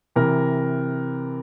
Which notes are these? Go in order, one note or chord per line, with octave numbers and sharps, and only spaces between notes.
C3 E3 A#4